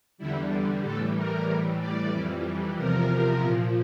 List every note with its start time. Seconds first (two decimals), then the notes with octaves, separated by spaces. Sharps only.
0.18 E2 D3 G3 E4
0.83 A2 E3 G3 A4
1.15 A#4
1.47 A2 E3 G3
1.79 D5
2.11 F2 E3 G3
2.76 E2 C3 F3 A#4
3.40 A#2 F3